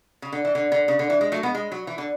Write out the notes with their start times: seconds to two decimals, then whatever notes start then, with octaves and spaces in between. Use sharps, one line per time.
0.22 C#3
0.32 D3
0.45 E3
0.55 D3
0.72 D3
0.88 C#3
0.99 D3
1.10 E3
1.21 G#3
1.32 F#3 A3
1.43 G#3 B3
1.55 G#3
1.72 F#3
1.87 E3
1.98 D3